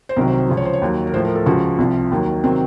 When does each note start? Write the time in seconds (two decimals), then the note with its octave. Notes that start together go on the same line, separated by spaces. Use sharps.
0.09 C5
0.16 C2 C3 D#3 F#3 A#4
0.27 C5
0.38 C5
0.48 C#2 C#3 F3
0.57 C#5
0.65 C5
0.73 C#5
0.81 D#2 D#3 F#3
1.07 A#4
1.14 A2 F3 C5
1.25 A#4
1.35 A4
1.46 C#2 C#3 F3 F#4
1.78 C2 C3 F3
2.11 D#2 D#3 F#3
2.44 C3 D#3 F#3 C4